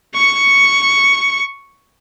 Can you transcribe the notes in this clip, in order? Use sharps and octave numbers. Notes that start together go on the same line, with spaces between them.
C#6 C#7